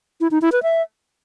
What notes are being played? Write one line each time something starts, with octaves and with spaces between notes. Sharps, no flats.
E4
D#4
E4
B4
E5